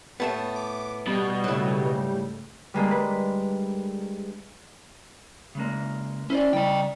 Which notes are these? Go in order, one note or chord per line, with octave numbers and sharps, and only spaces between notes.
A2 A3 B3 A5
D6
B2 G3
G#2 C#3 F#3 A3 E4
G3 G#3 A#3 D4
B4
C#3 G#3 A#3
C#4 E4 C5 D5
C#3 G3 D5 D#5 G5